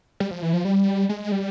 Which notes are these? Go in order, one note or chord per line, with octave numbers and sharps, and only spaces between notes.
G3
F3
E3
F3
G3
G#3
G3